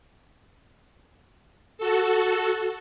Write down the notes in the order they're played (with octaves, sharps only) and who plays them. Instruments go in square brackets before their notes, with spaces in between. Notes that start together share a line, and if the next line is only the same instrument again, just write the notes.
[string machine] F#4 A4